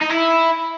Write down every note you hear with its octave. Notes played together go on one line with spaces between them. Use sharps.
D#4
E4